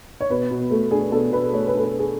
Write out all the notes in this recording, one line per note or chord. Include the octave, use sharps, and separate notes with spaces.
C#5
B2 B4
B2
A3
D4 G#4
B2 A4
B2 B4
A3 C#5
B4
D4 A4
B4
B2
G#4